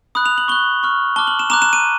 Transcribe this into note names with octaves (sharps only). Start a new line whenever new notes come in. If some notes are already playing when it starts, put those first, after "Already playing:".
B5 D#6 F#6
F7
F#7
C#6 F#6 G7
C#6 F6
A5 D6 F6 G7
F#7
E7
A#5 D6 F#6 E7
E7
D#7